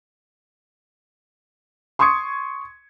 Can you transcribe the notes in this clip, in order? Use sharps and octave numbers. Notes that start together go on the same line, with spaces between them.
C6 C#6 D#6 G#6 C#7